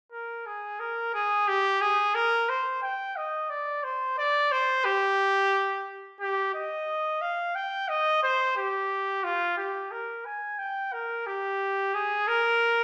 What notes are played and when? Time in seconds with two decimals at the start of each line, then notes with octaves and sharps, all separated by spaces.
0.12 A#4
0.46 G#4
0.80 A#4
1.14 G#4
1.48 G4
1.81 G#4
2.15 A#4
2.49 C5
2.82 G5
3.16 D#5
3.50 D5
3.84 C5
4.18 D5
4.52 C5
4.85 G4
6.20 G4
6.54 D#5
7.21 F5
7.55 G5
7.89 D#5
8.23 C5
8.56 G4
9.24 F4
9.57 G4
9.91 A#4
10.25 G#5
10.59 G5
10.93 A#4
11.26 G4
11.94 G#4
12.28 A#4